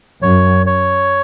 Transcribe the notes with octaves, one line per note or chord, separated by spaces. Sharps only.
F#2 C#5
C#5